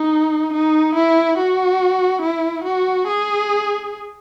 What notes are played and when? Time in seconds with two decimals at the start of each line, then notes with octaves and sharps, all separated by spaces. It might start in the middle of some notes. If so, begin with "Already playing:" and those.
Already playing: D#4
0.53 D#4
0.95 E4
1.38 F#4
2.22 E4
2.64 F#4
3.07 G#4